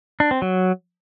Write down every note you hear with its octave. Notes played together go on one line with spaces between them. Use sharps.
D4
C4
F#3